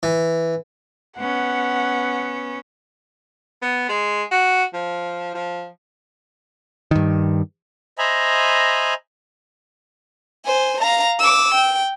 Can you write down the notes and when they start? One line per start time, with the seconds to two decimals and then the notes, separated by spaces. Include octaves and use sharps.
0.03 E3
1.19 B3 C#4 F#5
3.62 B3
3.89 G#3
4.31 F#4
4.73 F3
5.34 F3
6.91 G2 D#3
7.98 C5 D#5 E5 G#5 A#5 B5
10.45 C5 G#5
10.81 F5 A#5
11.19 D6 E6
11.54 G5